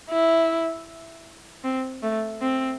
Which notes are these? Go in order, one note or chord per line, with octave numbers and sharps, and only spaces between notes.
E4
C4
A3
C4